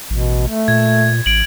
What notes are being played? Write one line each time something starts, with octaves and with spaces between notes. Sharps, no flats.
A1 B2
A3
A#2 G#6
A1 D7 F#7